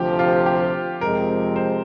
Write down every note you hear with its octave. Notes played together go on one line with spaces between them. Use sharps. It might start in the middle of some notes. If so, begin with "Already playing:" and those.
Already playing: D2 C3 F3 G4
F4
G4
F2 C3 F3 G#3 C4 A#4
C5